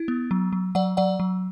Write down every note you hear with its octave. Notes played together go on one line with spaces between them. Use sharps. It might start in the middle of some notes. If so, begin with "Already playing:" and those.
Already playing: E4
B3
F#3
F#3
F#3 D5 F#5
F#3 D5 F#5
F#3